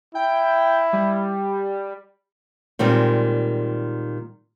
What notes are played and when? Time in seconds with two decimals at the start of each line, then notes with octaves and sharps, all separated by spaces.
0.15 E4 G5
0.93 G3
2.79 A#2 D#3 G3 G#3 C4